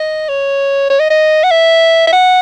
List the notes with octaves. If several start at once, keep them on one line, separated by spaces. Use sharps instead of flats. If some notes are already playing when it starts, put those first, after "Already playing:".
Already playing: D#5
C#5
C#5
D#5
D#5
F#5
E5
E5
F#5